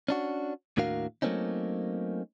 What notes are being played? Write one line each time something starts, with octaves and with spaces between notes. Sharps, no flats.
C#4 D4 F#4
D#2 A2 D4 F#4 A#4 F5
F#3 A3 A#3 C4 C#4 D#4